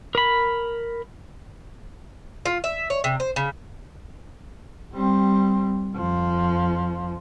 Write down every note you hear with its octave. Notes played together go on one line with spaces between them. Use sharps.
A#4 B5
F4
E5
C#5
C3
C5
C#3
G3 C4
F2 F3